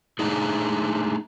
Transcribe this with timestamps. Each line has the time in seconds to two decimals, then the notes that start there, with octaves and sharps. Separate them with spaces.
0.19 A3 D4 D#4 G#4